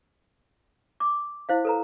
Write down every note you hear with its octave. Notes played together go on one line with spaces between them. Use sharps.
D6
E4 C5 F5
A4 B4 A#5